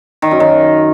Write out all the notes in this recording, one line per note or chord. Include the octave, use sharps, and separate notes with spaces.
D#3
F#2
D#3